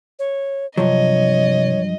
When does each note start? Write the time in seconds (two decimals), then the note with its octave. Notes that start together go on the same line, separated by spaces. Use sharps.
0.19 C#5
0.77 G2 C3 F3 F#3 C#5 D#5